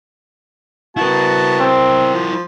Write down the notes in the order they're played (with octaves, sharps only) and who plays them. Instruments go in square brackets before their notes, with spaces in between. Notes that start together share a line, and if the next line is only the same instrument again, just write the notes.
[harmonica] B3 F#4 A5 [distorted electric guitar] E4 A#4
[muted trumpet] C4
[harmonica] F3